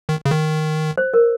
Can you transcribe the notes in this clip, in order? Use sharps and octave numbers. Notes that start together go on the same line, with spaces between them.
D#3
C#3
D#3
C5
A#4